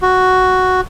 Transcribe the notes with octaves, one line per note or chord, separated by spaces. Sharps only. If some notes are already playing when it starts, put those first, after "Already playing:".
F#4